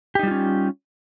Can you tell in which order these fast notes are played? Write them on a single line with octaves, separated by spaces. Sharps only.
G4 D#4 G3 F4 C#4